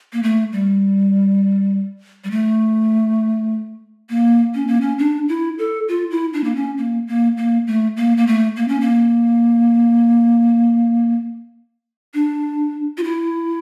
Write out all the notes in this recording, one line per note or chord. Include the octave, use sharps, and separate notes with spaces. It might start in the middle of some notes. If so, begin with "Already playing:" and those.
A#3
A3
G3
G3
A3
A#3
C#4
A#3
C#4
D4
E4
A4
F4
E4
D4
A#3
C#4
A#3
A#3
A#3
A3
A#3
A#3
A3
A#3
C#4
A#3
D4
F4
E4